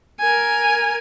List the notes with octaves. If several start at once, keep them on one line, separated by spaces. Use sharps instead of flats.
A#4 G#5